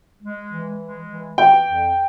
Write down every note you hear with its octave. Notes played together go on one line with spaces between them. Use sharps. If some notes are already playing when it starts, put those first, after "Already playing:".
G#3
E3
G#3
E3
E3 G5
F2